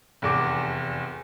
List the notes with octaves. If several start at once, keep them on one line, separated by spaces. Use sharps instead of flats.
F1 E2 D6